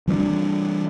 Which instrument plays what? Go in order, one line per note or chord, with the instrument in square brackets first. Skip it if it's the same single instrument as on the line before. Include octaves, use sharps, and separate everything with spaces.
[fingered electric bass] E3 G3 A3 D4